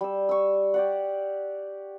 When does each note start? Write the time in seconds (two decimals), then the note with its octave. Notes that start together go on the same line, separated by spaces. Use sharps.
0.01 G3 E6
0.29 C#6 E6
0.74 G4 D5 F#5